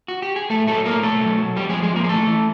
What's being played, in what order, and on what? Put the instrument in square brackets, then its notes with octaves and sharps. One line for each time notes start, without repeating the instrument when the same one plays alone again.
[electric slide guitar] F#4
G4
G#4
A2 A3 A4
F#3 A3 A4
A2 A#3 A#4
B2 A3 A4
F#3
F#3
F2 G3 G4
G#3 G#4
F3
G#3 G#4
F3 A#3 A#4
G#4
E3 A3 A4
E3